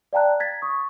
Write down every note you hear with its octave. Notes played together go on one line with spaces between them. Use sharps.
D5 F5 G5 A5 A#5 F#6
G#6 A6 B6
C#6 D#6